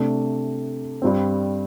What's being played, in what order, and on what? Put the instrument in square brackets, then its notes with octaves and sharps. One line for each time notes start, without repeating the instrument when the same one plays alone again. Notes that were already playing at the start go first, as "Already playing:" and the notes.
Already playing: [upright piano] C3 A3 D4
G2 G3 C4